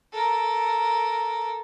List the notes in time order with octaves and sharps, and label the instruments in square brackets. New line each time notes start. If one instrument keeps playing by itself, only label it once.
[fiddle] A4 A#4